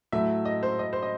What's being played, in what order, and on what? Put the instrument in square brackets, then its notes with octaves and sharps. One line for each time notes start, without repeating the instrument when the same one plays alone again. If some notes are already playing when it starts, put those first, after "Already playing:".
[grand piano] A2 F#3 A3 [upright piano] E5
[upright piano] D#5
C5
D#5
C5
D#5